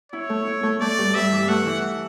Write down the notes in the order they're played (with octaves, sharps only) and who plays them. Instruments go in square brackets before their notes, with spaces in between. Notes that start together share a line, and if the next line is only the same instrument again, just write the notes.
[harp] E4 [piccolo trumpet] C#5
[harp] A3
E4
A3
[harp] A3 [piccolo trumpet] D5
[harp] G2
[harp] G2 [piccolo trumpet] E5
[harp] E3
[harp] A3 [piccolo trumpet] F#5
[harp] E3